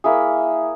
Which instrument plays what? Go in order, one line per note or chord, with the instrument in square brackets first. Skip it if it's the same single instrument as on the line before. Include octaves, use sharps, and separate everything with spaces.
[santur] A#3 E4 G#4